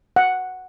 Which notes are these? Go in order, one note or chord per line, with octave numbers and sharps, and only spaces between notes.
F#5